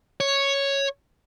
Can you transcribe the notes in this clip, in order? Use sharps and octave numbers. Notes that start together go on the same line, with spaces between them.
C#5